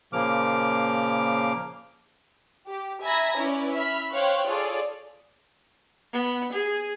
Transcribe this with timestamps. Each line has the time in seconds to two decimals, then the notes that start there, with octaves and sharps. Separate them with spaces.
0.13 A#2 C#3 F3 A#3 D6 F6
2.69 G4
3.03 E5 G#5 A#5 B5 G#6 A#6
3.38 C#4 E4 B4 D5
3.74 E5 B5 F6 B6
4.13 C5 C#5 F5 G5 C#6 F#6
4.48 F4 G#4 A4 C#5 D5 F5
6.13 B3
6.53 G#4